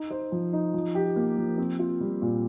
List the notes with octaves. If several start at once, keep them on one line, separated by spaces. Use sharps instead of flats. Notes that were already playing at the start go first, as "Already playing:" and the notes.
Already playing: D#4
C5
F3
D#4
F3
G4
A#3
F3
C4
F4
G3
A#2